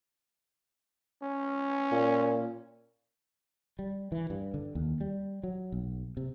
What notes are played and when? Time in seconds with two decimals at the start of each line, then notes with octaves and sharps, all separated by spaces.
1.23 C#4
1.91 A#2
3.79 G3
4.12 E3
4.30 G2
4.54 D3
4.75 D#2
5.01 G3
5.44 F#3
5.72 B1
6.17 C3